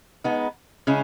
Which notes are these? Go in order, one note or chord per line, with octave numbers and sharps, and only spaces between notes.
G#3 B3 D#4
C#3 G#3 C#4 E4